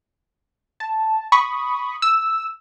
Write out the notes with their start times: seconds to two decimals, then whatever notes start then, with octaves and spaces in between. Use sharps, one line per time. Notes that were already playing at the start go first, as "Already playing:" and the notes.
0.80 A5
1.32 B5 C#6 D#6
2.02 E6